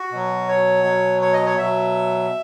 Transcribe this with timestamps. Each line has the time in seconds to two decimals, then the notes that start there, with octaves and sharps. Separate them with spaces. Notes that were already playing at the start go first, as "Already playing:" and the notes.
Already playing: F#4
0.11 B2 F#3
0.48 C#5
0.84 B2 F#3
1.22 C#5
1.33 D#5
1.46 C#5
1.57 B2 F#3 E5